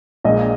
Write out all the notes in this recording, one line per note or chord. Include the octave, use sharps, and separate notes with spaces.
A#1 A#2 G#3 D#5